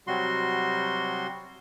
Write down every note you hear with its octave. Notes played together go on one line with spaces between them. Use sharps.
C3 F#3 G3 F#4 C6